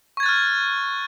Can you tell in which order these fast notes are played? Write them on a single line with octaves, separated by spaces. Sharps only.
C#6 G#6 A6 F#6 F6